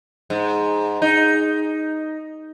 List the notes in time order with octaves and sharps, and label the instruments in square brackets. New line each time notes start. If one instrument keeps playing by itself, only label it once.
[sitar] G#2
D#4